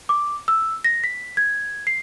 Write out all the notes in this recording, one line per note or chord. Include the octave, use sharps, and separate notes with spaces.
D6
E6
A#6
B6
G#6
C7